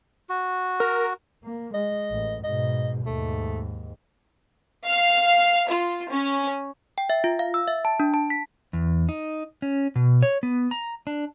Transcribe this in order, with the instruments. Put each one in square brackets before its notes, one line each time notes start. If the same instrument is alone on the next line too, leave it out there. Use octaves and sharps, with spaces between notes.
[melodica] F#4
[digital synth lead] A#4
[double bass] A#3
[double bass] G#3 [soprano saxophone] D#5
[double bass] A1
[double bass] G#2 B2 [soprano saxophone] D#5
[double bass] D#2 G#2 [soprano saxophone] A3
[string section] F5
F4
C#4
[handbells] G5
E5
F4
F5
E6
E5
A5
D4
A5
B6
[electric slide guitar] E2
D#4
C#4
B2
C#5
B3
A#5
D4